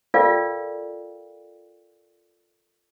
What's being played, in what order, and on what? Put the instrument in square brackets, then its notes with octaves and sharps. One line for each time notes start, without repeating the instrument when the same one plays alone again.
[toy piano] F4 A4 A#4 D5 F5 G5